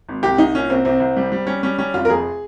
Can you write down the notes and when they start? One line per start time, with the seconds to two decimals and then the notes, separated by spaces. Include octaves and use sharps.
0.09 G#1
0.23 C2 G4
0.38 C2 D#4
0.55 A#2 C#4
0.70 C2 C4
0.85 C2 C4
1.00 C2
1.17 G3
1.32 G3
1.47 G3 C#4
1.63 G3 C#4
1.79 G3 C#4
1.94 F1 F4
2.05 A#4
2.10 F2 G#4